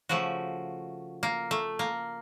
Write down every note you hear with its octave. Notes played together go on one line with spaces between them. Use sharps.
C#3 F3 A3 F#4
A#3
A3
A#3